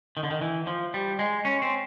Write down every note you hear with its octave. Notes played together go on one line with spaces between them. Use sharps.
D#3
D3
D#3
E3
F3
G3
G#3
C#4
C4